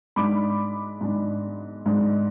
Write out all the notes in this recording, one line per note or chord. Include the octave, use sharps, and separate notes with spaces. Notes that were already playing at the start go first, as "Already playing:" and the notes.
G#2 G#3 D4 B5 D6
G#2 G#3 D4
G#2 G#3 D4